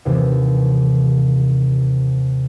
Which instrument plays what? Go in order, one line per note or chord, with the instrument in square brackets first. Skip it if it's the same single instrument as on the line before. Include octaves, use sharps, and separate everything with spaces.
[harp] D#2 C3 E3